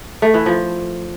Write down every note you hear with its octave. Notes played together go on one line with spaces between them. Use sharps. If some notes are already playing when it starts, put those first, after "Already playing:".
A3
E3
F3